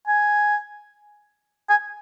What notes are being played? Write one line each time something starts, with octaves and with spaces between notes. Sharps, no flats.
G#5
G#5